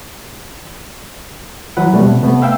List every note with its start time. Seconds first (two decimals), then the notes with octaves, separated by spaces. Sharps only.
1.77 E3 F#3 B4 F#5
1.93 B2 G3 A3
2.07 C3
2.22 C3 A3 B3
2.42 E5 F5 G5 E6